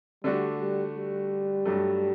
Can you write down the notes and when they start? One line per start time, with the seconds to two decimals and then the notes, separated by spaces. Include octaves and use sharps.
0.24 D3 G3 A3 D4 F#4
0.59 G3
0.95 G3
1.65 G2 F#3 A3